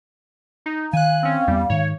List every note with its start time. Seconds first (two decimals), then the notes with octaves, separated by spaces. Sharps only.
0.66 D#4
0.93 D#3 F5 G#5 F#6
1.23 C4 C#4
1.47 E2 G3 B3
1.70 G#2 D#3 C#5